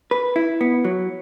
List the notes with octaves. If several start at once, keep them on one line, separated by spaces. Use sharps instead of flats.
B4
E4
B3
F#3